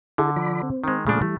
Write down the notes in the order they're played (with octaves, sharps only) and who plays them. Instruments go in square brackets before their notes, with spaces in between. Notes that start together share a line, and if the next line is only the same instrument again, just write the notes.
[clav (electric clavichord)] D3 [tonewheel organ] E4 G#4 A4
[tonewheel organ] F3 D5 B5
C4
[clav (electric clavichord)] D#3 G#3
[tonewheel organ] A#2 G#3 A3 [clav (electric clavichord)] C#3 F3 D4
[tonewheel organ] E3 G3 [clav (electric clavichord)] A3